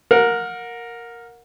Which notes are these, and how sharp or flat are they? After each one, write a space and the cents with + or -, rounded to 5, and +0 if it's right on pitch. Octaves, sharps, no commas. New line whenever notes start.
A#4 +0 F#5 -35